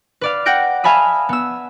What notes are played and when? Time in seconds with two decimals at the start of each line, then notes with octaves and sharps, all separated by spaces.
0.21 B4 D5 F5
0.46 F#5 G5 G6 A#6 D7
0.84 E5 F5 G#5 A5 B5 D#6
1.29 B3 E6